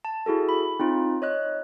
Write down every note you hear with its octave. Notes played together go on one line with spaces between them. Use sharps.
A5
E4 F#4 G#4 A4
B5
C4 D#4 F4
C#5 D#5 F#6